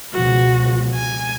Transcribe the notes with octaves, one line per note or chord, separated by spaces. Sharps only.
C#2 B2 F3 F#4
G#5